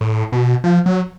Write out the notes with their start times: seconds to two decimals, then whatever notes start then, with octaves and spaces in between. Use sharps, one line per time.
0.01 A2
0.32 B2
0.64 F3
0.86 F#3